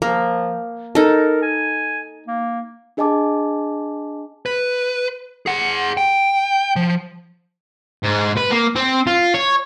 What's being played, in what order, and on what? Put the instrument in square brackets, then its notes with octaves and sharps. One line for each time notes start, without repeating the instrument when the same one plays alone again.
[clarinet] F3 [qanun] A#3
[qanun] D#4 A4 [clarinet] A#4
[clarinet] G#5
A#3
[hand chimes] D4 G#4 D#5 G#5 A5 D6
[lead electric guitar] B4
G#4 F#5
G5
F3
[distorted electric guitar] G#2
B4
A#3
C4
F4
C#5